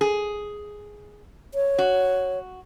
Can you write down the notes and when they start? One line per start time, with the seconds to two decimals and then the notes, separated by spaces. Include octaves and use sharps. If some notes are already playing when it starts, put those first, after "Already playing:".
0.01 G#4
1.54 C#5
1.78 F#4